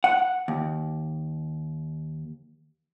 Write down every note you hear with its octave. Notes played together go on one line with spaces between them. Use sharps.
F#5
D#2